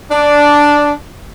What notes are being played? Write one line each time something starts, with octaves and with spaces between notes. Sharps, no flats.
D4